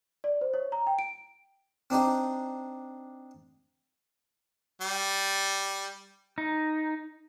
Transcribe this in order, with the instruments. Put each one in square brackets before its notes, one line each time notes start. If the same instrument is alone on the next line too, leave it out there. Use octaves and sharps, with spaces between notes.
[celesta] D5
C5
C#5
A#5
G5
D7
[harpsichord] C4 D4 D#4 G4
[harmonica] G3
[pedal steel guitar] D#4